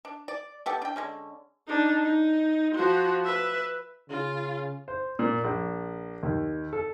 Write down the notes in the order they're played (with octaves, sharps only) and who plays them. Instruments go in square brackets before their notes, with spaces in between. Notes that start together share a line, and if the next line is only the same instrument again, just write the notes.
[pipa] D4
D5
B3 G4 A4
D4 G5
D3 G#3 C#4
[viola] D4 D#4
D#4
F3 F#4
B4 E5
[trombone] C#3 [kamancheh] F4
[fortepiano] C5
A#2
A#1
D#2
A4